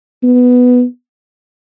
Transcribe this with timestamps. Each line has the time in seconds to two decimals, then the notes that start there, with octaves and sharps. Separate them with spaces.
0.23 B3